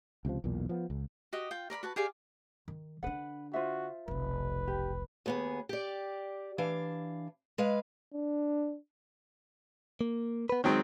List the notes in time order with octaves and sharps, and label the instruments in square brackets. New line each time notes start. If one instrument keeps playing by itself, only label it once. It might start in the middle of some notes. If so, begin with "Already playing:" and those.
[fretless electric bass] C#2 C3 D#3 F3
B1 E2 A#2
F3 B3
C#2
[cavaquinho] F#4 G4 D#5
F4 G5
A#4 D5 A#5 B5
F#4 B4 A5
G4 G#4 D5 F5
[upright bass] D#3
[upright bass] D3 D4 [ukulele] B4 F#5
[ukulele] F4 C5 E5 [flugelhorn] F#4
[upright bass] F1 B1 [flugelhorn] B4
[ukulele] G4
[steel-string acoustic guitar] D#2 B3 G#4
G4 D5
E3 D4 F5
G#3 B4 F5
[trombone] D4
[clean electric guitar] A#3
B3 B4
[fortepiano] D#3 F#3 C4 [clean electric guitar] G#3 C#5